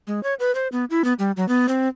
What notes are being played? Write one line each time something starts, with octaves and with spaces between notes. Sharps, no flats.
G#3
C#5
B4
C5
B3
E4
B3
G3
F#3
B3
C4